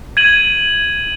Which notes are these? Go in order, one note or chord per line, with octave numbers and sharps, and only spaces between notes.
G#6 D#7 F#7